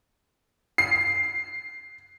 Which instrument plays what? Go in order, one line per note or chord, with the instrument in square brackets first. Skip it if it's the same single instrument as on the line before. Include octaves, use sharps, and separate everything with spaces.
[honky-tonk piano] C7